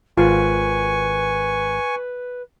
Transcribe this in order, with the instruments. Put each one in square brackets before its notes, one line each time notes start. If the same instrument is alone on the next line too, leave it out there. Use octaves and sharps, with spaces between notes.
[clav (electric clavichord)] G#1 [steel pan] F4 [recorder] B4 [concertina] G#5 C#6